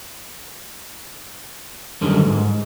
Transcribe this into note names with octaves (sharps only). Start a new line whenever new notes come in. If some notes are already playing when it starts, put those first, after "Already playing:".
F#2 D3 D#3 G3
G#2